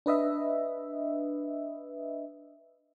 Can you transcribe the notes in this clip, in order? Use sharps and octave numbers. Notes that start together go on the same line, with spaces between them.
D4 B4 D#5 E5